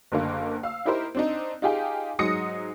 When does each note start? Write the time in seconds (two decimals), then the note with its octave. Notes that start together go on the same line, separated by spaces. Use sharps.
0.12 F#1 D3 A#3
0.63 F5 E6
0.85 D#4 E4 G4 A#4 C5
1.15 C4 D4 D#4
1.62 D#4 F4 G4 G#4 G5
2.19 G#2 F#3 G#3 D#6 A#6 C#7